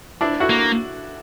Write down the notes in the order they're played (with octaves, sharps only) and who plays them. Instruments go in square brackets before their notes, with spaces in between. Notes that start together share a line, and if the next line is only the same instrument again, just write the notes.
[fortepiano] D4 E4
E4 F#4
[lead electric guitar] A#3